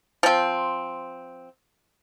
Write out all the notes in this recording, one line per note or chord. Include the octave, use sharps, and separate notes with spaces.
F3 C4